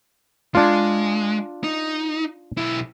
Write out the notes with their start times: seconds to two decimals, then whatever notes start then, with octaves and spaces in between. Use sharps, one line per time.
0.55 G#3 D4 F4
1.64 D#4
2.57 B1 E4